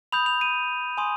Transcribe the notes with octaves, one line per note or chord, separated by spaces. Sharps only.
B5 D#6 G6 F7
F7
D#7
G#5 C6 D#6